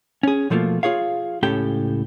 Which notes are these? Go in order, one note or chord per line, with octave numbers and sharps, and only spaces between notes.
C#4 G#4
B2 F3 A3 A#3 F4
F4 G#4 C#5 F5
C#2 A2 C#4 G4 A4 G5